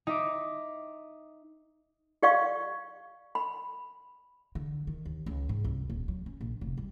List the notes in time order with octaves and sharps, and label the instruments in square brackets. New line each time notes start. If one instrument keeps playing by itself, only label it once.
[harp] D#4 E5 D6
[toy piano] G4 D5 F5 C#6
B5
[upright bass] D3
D#3
D#2
C#2
G#2
C2
D#1
F#3
C#4
A#1
F1
G3